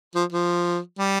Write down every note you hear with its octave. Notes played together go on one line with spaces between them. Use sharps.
F3
F3
G3